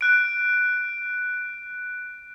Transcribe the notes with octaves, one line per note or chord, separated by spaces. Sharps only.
F#6 D7